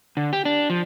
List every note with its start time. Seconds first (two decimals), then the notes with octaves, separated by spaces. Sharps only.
0.17 D3
0.33 G4
0.45 D4
0.70 F3